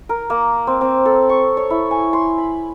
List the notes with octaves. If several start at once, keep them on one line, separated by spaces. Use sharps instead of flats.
A#4
A#3
C4
C4
A4
C#6
C#5
E4
G#5
C6
B5